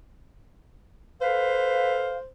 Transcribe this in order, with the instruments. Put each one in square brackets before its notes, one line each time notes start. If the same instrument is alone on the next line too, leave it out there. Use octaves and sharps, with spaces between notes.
[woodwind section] A4 B4 F5 [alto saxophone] C5